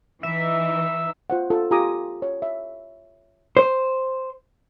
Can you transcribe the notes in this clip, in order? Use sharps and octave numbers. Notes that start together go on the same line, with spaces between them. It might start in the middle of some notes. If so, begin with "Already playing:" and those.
E3 D#4 E5
F4 C5 F#5
F4 A4
F4 G4 G#5 A#5 D6 D#6
C#5
E5
C5